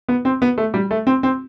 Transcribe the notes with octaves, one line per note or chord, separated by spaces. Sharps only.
B3
C4
B3
A3
G3
A3
C4
C4